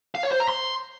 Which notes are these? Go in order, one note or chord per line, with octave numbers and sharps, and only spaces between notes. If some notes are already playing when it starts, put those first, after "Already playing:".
F5
C#5
C5
A#5
C6